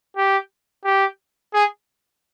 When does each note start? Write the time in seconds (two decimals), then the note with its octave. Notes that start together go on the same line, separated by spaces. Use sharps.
0.17 G4
0.85 G4
1.54 G#4